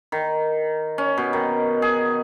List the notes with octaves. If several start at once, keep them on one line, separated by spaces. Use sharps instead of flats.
D#3
C#4
B2
D#3
G#4